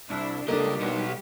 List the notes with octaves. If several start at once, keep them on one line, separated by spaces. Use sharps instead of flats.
C2 D4 E4
C#2 G3 A#3 D4 G4 A4 D#5
B1 B3 D#4